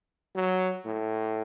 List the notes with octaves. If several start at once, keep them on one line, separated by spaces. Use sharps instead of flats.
F#3
A2